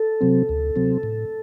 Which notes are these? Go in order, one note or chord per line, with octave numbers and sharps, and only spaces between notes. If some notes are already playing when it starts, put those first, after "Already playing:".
Already playing: A4
C3 F#3 C4
D2
C3 F#3 C4
A2